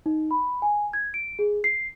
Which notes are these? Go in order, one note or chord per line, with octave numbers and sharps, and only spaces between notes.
D#4
B5
G#5
G#6
D7
G#4
C7